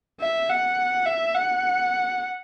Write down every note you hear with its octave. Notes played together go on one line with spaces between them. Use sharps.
E5
F#5
E5
F#5